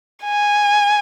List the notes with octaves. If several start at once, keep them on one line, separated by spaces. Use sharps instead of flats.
G#5